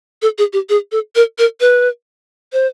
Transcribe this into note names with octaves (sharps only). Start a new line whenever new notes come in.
A4
G#4
G4
G#4
A4
A#4
A#4
B4
C5